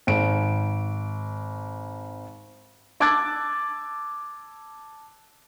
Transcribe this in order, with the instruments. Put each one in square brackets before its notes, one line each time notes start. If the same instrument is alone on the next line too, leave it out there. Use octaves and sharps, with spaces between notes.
[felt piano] G#1 D7
[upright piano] A5 D6 E6 F#6 G#6 A6